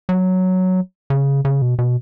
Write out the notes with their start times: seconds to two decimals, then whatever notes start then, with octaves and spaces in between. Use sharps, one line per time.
0.09 F#3
1.10 C#3
1.45 C#3
1.62 B2
1.79 B2